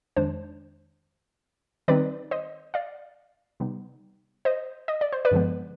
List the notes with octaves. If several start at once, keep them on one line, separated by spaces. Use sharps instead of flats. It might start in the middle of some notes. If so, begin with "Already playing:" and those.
F2 D#3 G#3 D4 C5
D#3 G3 C4 D#4 B4 D5
C5 D#5
D5 F5
C3 G3 B3 D#4
C5 D#5
D#5
D5
C5
B4 D5
G2 D3 F3 G#3 B3